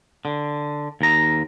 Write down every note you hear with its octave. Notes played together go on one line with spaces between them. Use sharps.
D3
D#2 A#5